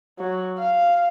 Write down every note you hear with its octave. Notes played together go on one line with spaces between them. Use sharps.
F#3
F5